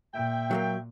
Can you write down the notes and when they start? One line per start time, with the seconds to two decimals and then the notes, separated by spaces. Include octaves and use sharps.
0.14 A#2 E5 G5
0.51 F#3 A3 A#3